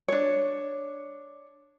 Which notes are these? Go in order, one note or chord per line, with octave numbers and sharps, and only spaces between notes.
D4 C#5